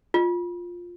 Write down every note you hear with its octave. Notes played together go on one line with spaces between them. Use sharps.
F4